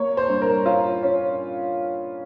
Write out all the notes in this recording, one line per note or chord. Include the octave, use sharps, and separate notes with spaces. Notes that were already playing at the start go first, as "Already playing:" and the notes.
Already playing: A#3 C#5
C5
G2
A#4
C#4 F4
C#4